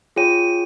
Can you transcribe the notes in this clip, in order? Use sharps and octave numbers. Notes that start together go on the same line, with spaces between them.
F4 G#4 C#5 G5 D#7